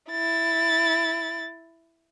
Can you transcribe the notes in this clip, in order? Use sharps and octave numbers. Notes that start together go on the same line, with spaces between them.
E4 A6